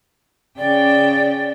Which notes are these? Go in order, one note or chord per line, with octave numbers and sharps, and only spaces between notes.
C#3 D5 G5